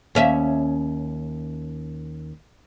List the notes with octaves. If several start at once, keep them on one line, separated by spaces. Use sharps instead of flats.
D#2 C#4 E5